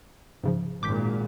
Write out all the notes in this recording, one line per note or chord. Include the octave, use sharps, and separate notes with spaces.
G#2 C#3 F3
G#1 A#2 D6 G6 B6